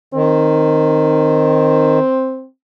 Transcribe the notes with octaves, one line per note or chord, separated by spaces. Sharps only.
D#3 C4